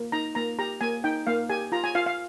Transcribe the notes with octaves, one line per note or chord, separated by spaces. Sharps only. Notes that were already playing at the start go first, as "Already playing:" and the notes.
Already playing: A#3
D#4 A#5
A#3 A#5
G4 A#5
A#3 G#5
D#4 G5
A#3 F5
G4 G#5
F4 A#5
G#5
F4 F5
F5